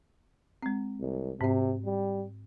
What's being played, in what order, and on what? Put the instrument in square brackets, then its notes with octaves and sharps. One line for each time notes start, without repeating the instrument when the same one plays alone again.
[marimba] G#3 C4
[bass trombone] C2
[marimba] G#2 C4 [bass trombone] C3
[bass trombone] G3